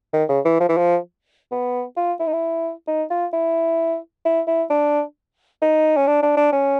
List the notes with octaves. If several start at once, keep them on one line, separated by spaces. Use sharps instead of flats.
D#3
C#3
E3
F3
E3
F3
B3
F4
E4
D#4
E4
D#4
F4
E4
E4
E4
D4
D#4
C#4
D4
D4
D4
C#4